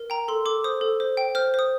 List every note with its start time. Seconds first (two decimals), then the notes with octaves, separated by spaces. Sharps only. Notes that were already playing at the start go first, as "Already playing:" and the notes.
Already playing: A#4
0.10 G5 A#5
0.28 A4 C6
0.45 A4 D6
0.64 C5 D#6
0.81 A4
1.00 C5
1.17 G5
1.35 C5 F6
1.54 C5 D#6